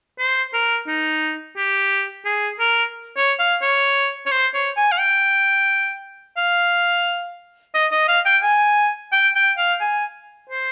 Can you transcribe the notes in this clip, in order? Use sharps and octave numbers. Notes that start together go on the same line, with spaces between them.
C5
A#4
D#4
G4
G#4
A#4
C#5
F5
C#5
C#5
C5
C#5
G#5
F5
G5
F5
D#5
D#5
F5
G5
G#5
G5
G5
F5
G#5
C5